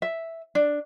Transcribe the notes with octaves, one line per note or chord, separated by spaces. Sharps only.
E5
D4